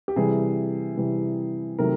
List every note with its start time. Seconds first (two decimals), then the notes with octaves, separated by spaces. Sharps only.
0.08 G4
0.16 C3 E3 G3 G#4
0.97 C3 E3 G3
1.79 C3 D#3 F#3 A3 A#4